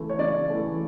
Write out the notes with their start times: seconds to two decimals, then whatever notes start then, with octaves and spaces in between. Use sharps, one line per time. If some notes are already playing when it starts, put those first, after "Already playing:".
Already playing: C#3 E3 A3
0.10 C#5
0.19 C#3 D5
0.50 E3 A3